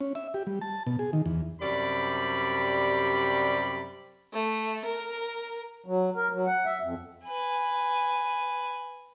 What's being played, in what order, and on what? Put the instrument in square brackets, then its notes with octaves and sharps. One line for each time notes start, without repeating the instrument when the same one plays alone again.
[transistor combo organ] C#4
E5
G4
G3
A5
B2
G#4
D#3
E2
[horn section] F#2 C3 G3 D5 B5
[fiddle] A3
A#4
[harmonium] F#3
A#4
F#3
F#5
E5
F2
[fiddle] B4 G#5